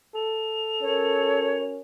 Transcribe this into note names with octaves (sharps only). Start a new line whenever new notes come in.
A4 F7
C#4 F#4 A#4 C#5